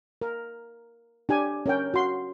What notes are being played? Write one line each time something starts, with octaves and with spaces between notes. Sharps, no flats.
A#4
D4 G4 G#5
C#4 A#4 G5
F#4 C6